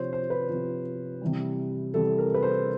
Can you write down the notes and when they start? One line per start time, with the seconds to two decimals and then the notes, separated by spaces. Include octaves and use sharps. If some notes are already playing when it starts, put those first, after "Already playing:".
Already playing: C3 F3 C5 C#5
0.13 C5
0.30 B4
0.49 C3 F3
1.21 C3 E3 G3
1.94 C3 E3 G3 A4
2.18 A#4
2.34 B4
2.43 C5